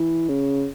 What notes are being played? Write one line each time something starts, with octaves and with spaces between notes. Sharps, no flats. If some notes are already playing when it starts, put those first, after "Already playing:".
Already playing: E3
C#3